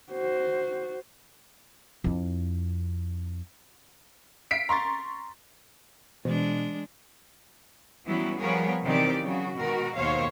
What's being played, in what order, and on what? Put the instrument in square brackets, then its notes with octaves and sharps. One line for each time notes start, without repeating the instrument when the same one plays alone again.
[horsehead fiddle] F#4 C5
[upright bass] F2 E4
[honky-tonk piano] B6 C7 D7
A#5 C6 C#6 A6
[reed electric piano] B2 [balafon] E3 [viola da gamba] G#3 D4
[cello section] E3 F#3 G3 B3 C#4 E4
F3 G3 B3 G#4 A#4 C#5
C3 D#3 E3 C4 G4 D5
C#3 F#3 F#4
B2 D#3 G#3 F#4 A#4
D#2 B2 C5 C#5 F5